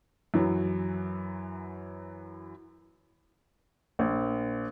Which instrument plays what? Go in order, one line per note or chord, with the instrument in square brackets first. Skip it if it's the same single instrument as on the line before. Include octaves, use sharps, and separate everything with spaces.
[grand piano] F#2 E3 F#3
[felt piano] A#1